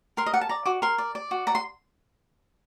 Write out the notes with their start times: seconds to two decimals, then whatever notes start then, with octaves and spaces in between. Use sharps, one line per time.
0.17 A#4 C6
0.26 D#5
0.34 D5 F#5
0.41 A5
0.49 D5 A#5
0.66 F#4 D6
0.82 A#4 C6
0.98 D5
1.15 D5
1.31 F#4
1.47 D5 A#5
1.55 C6